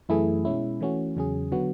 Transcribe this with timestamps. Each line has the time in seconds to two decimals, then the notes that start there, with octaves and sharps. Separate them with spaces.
0.09 F#2 E3 A3 E4 G#4
0.45 B2 G#3 C#4 E4
0.81 E3 A3 C#4 F#4
1.16 E2 C#3 F#3 C#4 G#4
1.52 D3 F#3 B3 F#4